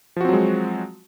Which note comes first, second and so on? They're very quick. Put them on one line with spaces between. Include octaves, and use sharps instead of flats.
F3 F#4 C4 F#3 G#3